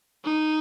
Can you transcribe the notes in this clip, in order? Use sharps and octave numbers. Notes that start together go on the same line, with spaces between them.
D#4